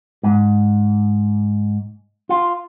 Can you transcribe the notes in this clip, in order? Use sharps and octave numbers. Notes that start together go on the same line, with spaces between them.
G#2
F4